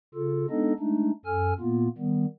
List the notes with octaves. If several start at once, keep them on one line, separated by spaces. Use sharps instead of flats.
C#3 F4 A4
G#3 B3 D4 D#4 A4 D#5
G#3 A3 D4 D#4
F#2 A4 G#5 F6
A#2 A#3 B3 F4
D#3 G3 B3